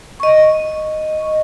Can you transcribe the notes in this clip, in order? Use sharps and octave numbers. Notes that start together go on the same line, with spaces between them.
D#5 C#6